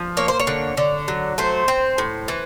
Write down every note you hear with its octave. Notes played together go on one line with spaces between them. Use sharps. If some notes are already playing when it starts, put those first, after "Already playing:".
Already playing: F3
A#3 C#5
C5
C#5
D3
D3
F#3
A3 C5
C4
A2
E3